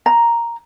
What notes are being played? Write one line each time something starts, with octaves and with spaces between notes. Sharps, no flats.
A#5